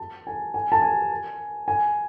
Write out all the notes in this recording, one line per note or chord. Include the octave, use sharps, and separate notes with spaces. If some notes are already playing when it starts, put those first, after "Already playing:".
Already playing: A5
G#5
G#5
A5
G#5
G#5